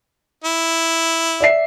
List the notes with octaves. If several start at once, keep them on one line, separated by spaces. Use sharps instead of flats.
E4
D5 E5 C7